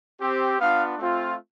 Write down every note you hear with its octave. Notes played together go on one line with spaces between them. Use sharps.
C4 G4
B3 D4 F4 F5
A3 C4 F4